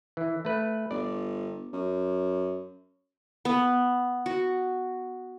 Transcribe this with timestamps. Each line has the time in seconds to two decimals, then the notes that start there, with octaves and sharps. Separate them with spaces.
0.17 E3
0.45 A3 B4
0.91 G1 D5
1.73 F#2
3.45 B3
4.26 F#4